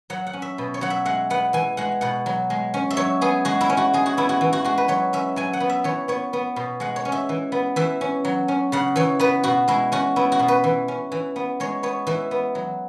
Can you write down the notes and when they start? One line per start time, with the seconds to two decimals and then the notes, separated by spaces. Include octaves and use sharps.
0.10 F#3 F#5
0.27 F#5
0.33 C#4
0.42 E5
0.58 B2
0.74 C#5
0.81 F#3 F#5
0.90 E5
1.05 G#3 F#5
1.30 B3 F#5
1.53 E3 G#5
1.77 G#3 F#5
2.01 B2 F#5
2.26 F#3
2.50 G#3
2.74 C#4
2.90 E5
2.97 F#3 C#5
3.21 B3 G#4
3.45 G#3 F#4
3.61 E4
3.70 C#4
3.77 F#4
3.93 G#3 G#4
4.06 F#4
4.17 B3 E4
4.29 F#4
4.41 E3
4.53 F#4
4.64 G#3 F#4
4.78 B4
4.88 F#3 C#5
5.13 C#4 E5
5.36 F#3 G#5
5.53 F#5
5.60 B3
5.69 E5
5.84 E3 C#5
6.08 B3 C#5
6.33 B3
6.56 B2
6.80 G#3 F#5
6.96 C#5
7.05 C#4
7.12 E5
7.29 E3
7.52 B3
7.76 E3 E5
8.01 C#4
8.25 F#3
8.48 C#4
8.72 C#3 F#5
8.96 E3 C#5
9.20 B3 B4
9.43 B2 F#4
9.68 G#3 E4
9.92 C#4 F#4
10.16 B3 E4
10.32 F#4
10.39 B2
10.48 B4
10.64 E3
10.88 C#4
11.12 E3
11.36 B3
11.60 G#3 C#5
11.83 B3 C#5
12.07 E3 E5
12.31 B3
12.55 F#3